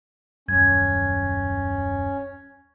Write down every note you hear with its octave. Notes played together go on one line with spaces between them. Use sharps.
D#1 F#2 C#4 G#6